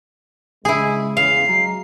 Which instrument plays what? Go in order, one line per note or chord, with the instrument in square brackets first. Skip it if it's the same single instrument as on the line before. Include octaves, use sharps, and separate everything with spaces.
[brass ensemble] C#3 G#3 [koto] E4 G#4
[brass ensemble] E2 C#3 [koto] F5 [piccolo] C7
[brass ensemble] F#3 G#3 A#5